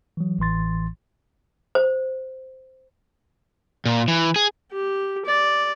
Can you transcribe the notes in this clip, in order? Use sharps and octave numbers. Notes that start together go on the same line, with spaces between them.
E3 F#3
A1 A2 E3 C6 A6
C5
A#2
E3
G#4
G4
D5